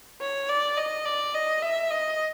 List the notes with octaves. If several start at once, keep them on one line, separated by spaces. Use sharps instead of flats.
C#5
D5
D#5
D5
D#5
E5
D#5